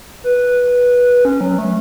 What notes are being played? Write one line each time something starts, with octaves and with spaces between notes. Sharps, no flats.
B4
C#4
F#3
A3